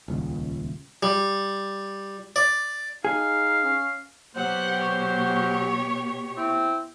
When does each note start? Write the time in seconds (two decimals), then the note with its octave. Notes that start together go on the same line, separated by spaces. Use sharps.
0.08 D#1 C#2
1.03 G3
2.36 D5
3.05 D#4 G#4 F5
3.64 C#4
4.36 B2 F#3 G4 C5 F#5
4.83 C#5
6.37 C4 E4